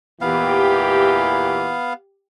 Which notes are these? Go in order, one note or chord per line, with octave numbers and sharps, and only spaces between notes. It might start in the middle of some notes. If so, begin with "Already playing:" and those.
E2 A#2 E3 B3 G4 F5